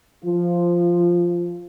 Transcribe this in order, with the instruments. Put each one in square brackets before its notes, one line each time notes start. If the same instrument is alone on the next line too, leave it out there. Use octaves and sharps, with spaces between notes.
[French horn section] F3 F4